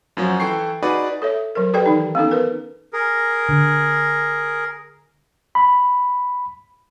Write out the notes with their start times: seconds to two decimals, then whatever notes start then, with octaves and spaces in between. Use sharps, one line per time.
0.17 F#2 F3 F#3
0.40 E3 E4 A4 G5 C#6 C7
0.83 D#4 F#4 G#4 B4 D5
1.22 A4 C#5 E5
1.55 F#3 A#4
1.73 G4 A4 B4 D5 G5
1.86 D#3 E3 D#4
2.15 B3 C#4 D#4 A4
2.31 A#4 B4
2.93 G#4 A#4
3.49 D3
5.55 B5